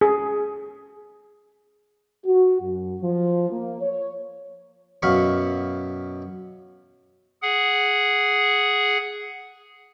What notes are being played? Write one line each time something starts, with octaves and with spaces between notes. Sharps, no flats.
G#4
F#4
F#2
F3
A#3
C#5
F#2 B2 F5 F#5 B5 C#6
G#4 F#5